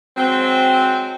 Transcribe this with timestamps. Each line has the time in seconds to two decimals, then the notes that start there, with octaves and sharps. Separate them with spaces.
0.17 F#3 G#3 C4